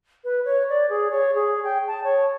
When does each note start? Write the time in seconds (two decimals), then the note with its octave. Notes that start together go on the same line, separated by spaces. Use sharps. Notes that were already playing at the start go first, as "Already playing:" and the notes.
0.24 B4
0.45 C#5
0.69 D5
0.90 G#4
1.11 C#5
1.35 G#4
1.64 G5
1.87 A5
2.04 C#5